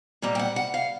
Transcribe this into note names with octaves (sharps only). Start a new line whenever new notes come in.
A#2 G3 A#3
G5
F#5
F#5
F5